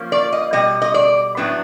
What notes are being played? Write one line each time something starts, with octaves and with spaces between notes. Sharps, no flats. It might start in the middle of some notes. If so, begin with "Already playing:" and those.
Already playing: F3 A#3 C#4
D5
D#5
B2 G3 D#5
D#5
D5
A2 F#3 B3 D4